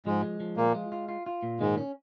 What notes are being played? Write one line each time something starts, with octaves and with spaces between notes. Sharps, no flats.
G#2 F3 G#3
G#3
F3
A#2 A#3 F4
G#3
F4
F4
F4
A#2
G#2 D#3 G#3
C#4